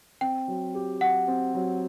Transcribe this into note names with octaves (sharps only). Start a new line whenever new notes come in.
C4 G5
F#3
G4
F#3 F#5
C4
F#3